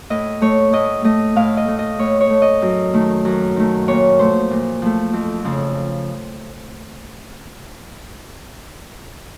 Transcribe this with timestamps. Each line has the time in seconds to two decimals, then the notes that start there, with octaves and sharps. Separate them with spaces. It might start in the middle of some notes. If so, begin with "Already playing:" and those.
0.10 A2 D#5
0.41 A3 C#5
0.73 A2 D#5
1.04 A3 D#5
1.36 A2 F5
1.57 D#5
1.68 A3
1.79 D#5
1.99 A2 C#5
2.21 C#5
2.30 A3
2.42 D#5
2.62 F#2
2.94 D#3 A3
3.25 F#2
3.56 D#3 A3
3.88 A#2 C#5
4.19 F3 A3 C5
4.50 A#2
4.82 F3 A3
5.13 F2
5.44 C#3 F3